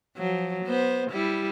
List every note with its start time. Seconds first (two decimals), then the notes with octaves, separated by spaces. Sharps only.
0.17 F3 F#3
0.65 B3 C5
1.10 G3 E4